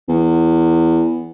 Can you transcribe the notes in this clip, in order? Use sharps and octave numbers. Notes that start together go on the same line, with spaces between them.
E2